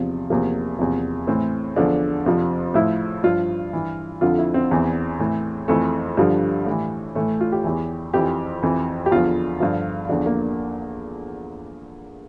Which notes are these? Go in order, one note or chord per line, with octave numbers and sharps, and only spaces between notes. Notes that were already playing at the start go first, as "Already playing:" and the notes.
Already playing: E2 C3 F3
E2 C3 F3 A#3
E2 C3 F3
A2 E3 C4
E2 D3 F3 D4
F2 C3 F3
A2 F3 E4
G2 F3 F4
G2 E3
F2 D3 F3 F4
E4
C4
E2 E3
A2 E3
F2 E3 A3
G2 D3 F3 G3
A2 E3
A2 E3 A3
F4
G4
E2 E3
F2 E3 G4
F2 E3
G4
E2 D3 F3 F4
G2 D3 F3
E2 D3 F3 D4
A#3